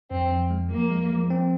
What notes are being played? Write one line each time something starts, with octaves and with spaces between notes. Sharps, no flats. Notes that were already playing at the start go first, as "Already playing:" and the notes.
F2 C4
F2
G#3
F3 A#3
G#3
F3
C4